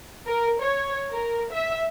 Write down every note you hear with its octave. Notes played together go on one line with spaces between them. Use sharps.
A#4
C#5
A#4
E5